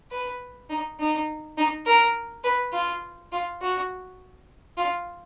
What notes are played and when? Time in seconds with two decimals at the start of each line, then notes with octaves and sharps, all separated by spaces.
0.11 B4
0.70 D#4
0.99 D#4
1.57 D#4
1.86 A#4
2.44 B4
2.73 F4
3.32 F4
3.61 F#4
4.77 F4